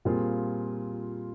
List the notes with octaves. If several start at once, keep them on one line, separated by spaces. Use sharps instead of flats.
A#2 G3 C4 F4 G#4